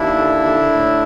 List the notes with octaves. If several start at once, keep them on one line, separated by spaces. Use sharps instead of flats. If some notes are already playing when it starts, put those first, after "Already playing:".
Already playing: D#2 D4 E4
D3
D3
A2